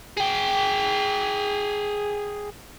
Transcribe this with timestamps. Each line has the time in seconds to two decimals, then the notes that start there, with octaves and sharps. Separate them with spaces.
0.17 G#4 G5